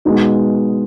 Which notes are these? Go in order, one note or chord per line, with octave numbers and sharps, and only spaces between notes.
B2 G#3 B3 D#4 F#4